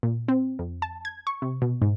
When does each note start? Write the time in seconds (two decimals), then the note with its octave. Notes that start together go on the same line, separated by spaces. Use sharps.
0.03 A#2
0.28 C4
0.59 F2
0.82 A5
1.05 G#6
1.27 C#6
1.42 C3
1.62 B2
1.82 G#2